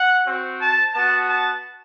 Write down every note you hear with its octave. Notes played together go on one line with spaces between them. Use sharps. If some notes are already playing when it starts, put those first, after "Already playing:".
Already playing: F#5
C4 F#4
A5
B3 F#4 A5
A5